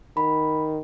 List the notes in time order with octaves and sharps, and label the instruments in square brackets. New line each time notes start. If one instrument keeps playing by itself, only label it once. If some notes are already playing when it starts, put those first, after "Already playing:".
[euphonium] D#3 [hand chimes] B5